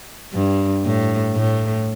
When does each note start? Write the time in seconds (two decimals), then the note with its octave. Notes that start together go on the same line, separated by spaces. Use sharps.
0.33 G2
0.84 A2
1.35 A2